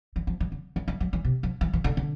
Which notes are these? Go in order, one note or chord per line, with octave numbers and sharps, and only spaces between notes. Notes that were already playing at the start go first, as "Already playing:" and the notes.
E3
F3
E3
D3
E3
E3
F3
E3
C3
F3
E3
E3
D3
D3